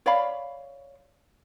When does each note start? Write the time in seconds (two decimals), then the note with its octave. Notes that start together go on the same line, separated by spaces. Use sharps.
0.06 C#5 D5 F5 B5